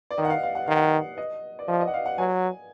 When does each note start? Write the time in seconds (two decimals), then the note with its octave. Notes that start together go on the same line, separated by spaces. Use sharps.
0.11 D5
0.18 D#3 D#5
0.25 F#5
0.30 F5
0.43 F5
0.55 F#5
0.66 D#3 F5
0.76 F#5
1.18 D#5
1.59 D5
1.68 F3 D#5
1.81 D#5
1.87 F#5
1.94 F5
2.06 F#5
2.18 F#3 G#5